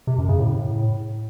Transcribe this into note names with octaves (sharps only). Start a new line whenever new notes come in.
C3
F#2
C#3
A2